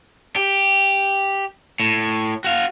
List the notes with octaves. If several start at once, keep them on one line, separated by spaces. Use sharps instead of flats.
G4
A2
F#4 F5